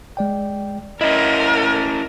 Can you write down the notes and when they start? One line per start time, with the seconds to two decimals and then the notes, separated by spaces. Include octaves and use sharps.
0.17 G#3 D5 G5
1.01 C#4 E4 A#4 D#5